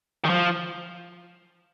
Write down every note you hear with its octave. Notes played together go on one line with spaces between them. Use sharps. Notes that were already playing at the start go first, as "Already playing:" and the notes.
D#3
F3